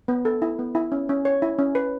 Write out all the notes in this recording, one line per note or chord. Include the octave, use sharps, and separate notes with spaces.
B3
A4
E4
B3
E4
C#4
C#4
C#5
E4
C#4
B4